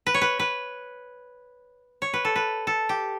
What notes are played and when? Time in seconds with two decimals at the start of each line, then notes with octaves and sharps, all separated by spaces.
0.06 B4
0.14 C#5
0.21 B4
0.39 B4
2.02 C#5
2.14 B4
2.25 A4
2.36 B4
2.67 A4
2.89 G4